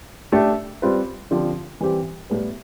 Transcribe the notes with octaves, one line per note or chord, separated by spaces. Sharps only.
A3 D4 G4
G3 C4 F4 B4
D3 F3 C4 G4
E3 G3 C4 G4
A2 G3 B3